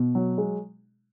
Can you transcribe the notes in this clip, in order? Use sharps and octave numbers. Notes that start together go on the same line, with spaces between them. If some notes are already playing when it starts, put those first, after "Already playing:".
Already playing: B2
F#3
G#3